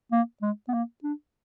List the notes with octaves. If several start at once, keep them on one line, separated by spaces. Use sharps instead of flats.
A#3
G#3
B3
A#3
D4